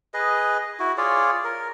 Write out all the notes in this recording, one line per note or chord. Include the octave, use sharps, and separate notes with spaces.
G#4 B4 D#5
E4 F#4
F4 G#4 C#5 D5
A#4